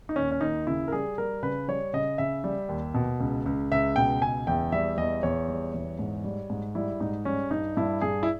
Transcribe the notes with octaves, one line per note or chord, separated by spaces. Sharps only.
D#4
D#2 C#4
C#4
D#2 D#4
C#3 E4
A#4
G3 G#4
G3 A#4
C#3 B4
G3 C#5
C#3 D#5
C#3 E5
G3
D#2
B2
C#2
C#2
C#2 E5
B2 G5
C#2 G#5
E2 G5
G3 E5
E2 D#5
E2 C#5
G3
E2
G#2
G3
G#2
G3 E4
G#2 D#4
G3 C#4
G2 D#4
G2 E4
G2 G#4
E4